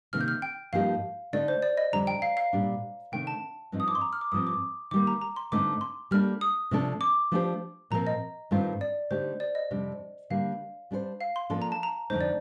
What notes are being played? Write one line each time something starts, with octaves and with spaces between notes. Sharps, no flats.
C3 D#3 A#3 F6
G6
F6
G5
G2 F3 A#3 D#4 G4 F5
D3 A3 D#4 A4 D5
C5
D5
D#5
F2 D3 G3 D4 A#5
G5
F5
F5
A#2 G3 D4
C3 D#3 A3 D4 G5
A5
G2 F3 C4 D#4
D#6
D6
C6
A#5
F6
D6
G2 F3 C4 D#6
D6
D#3 G3 A#3 D6
A#5
A#5
C6
G2 D3 A3 C4 D#4 D6
C6
G3 A#3 D4 A4 F6
D#6
C3 F3 A3 D4 A4
D6
F3 A3 D4 G4 C5
A#2 F3 C4 F4 A#4 A#5
D#5
G2 D#3 A3 C4 F4
D5
D3 A3 D#4 G4 C5
D5
D#5
F2 C3 G3 D4
D3 G3 A#3 F5
G3 D4 A4 C5
F5
C6
F3 A#3 D4 A4 C6
A#5
A5
A#5
F2 D3 A3 D#4 C5
D5